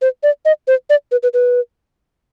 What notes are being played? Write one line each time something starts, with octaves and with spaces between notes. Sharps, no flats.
C5
D5
D#5
C5
D5
B4
B4
B4